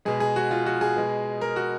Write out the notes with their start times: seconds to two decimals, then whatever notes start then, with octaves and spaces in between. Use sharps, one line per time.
0.05 B2 G#3 G#4
0.20 G#4
0.36 F#4
0.51 F4
0.66 F#4
0.81 G#4
0.96 B2 G#3
1.41 A#4
1.56 F#4